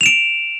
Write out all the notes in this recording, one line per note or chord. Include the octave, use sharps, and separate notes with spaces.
D7 E7 F7